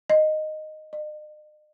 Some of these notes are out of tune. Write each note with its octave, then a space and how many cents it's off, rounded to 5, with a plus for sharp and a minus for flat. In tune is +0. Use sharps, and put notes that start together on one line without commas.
D#5 -10
D#5 -45